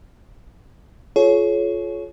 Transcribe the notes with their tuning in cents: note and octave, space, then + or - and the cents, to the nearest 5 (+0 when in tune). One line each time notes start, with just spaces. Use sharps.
F4 +0 G#4 +45 C#5 +0